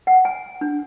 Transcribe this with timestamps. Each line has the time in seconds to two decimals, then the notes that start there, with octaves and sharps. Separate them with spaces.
0.07 F#5
0.25 G#5
0.61 D4